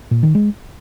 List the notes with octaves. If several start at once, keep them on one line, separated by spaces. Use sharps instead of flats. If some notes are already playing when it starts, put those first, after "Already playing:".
A#2
D#3
G#3